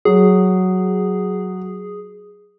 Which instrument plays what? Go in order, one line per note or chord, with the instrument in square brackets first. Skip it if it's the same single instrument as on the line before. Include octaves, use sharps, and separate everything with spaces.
[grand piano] F#3 [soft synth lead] G#4